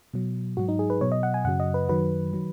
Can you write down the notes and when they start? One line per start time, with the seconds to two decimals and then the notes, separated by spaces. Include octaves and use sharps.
0.13 B2 F#3
0.57 G#2 F#3 F#4
0.69 D#4
0.79 G#4
0.90 B4
1.01 B2 F#3 C#5
1.12 D#5
1.23 F#5
1.34 G#5
1.44 F#2 C#3 F#3 F#5
1.60 D#5
1.74 B4
1.89 F#2 D#3 F#3 B4
2.33 D#3 F#3